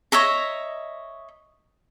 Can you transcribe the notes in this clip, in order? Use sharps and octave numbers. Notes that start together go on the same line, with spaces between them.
C#5 D#5 E5 A#5